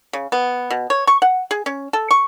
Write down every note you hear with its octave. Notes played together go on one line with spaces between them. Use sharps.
C#3
B3
B2
C#5
C#6
F#5
G#4
C#4
A4
C#6